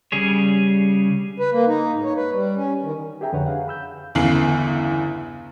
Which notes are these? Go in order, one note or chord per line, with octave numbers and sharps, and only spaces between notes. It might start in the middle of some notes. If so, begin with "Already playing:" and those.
C#3 G3 G#4 C#5
B4
A#3
D#4
G#2
C#5
B4
G3
C#4
D#3
G4 G#4 E5 G5 A#5
F2 D3 B4 C#5 F#5
G#4 F5 F#5
B5 E6 G6
G1 E2 C#3 C7 F#7